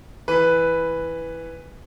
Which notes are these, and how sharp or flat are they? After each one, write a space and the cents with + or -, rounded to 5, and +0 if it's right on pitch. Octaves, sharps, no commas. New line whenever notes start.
E3 +0 B4 +0